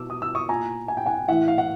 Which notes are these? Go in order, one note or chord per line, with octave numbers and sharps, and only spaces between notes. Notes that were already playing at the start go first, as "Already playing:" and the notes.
Already playing: B2 D6 E6
D#6
E6
C#6 D#6
A#2 G#5 A#5
G#5
G5
F#5 G#5
A2 E3 E5 F#5
F5
F#5